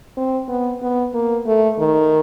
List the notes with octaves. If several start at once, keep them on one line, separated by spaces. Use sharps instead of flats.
C4
B3
B3
A#3
A3
D#3